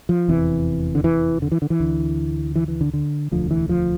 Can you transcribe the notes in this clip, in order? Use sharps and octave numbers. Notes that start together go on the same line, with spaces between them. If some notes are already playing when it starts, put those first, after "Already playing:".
F3
F1 E2 C3 E3
D3
E3
D3
E3
D3
E3
D2 D3
E3
E3
D3
D3
E1 D2 D3 F3
E3
F3